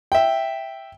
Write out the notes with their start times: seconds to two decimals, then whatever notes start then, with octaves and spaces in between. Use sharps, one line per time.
0.12 E5 G5